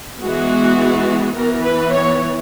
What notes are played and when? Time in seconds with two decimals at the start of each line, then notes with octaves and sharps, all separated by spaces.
0.22 E3 G#3 B3 F#4
1.35 E3 B3 A#4
1.65 B4
1.92 C#5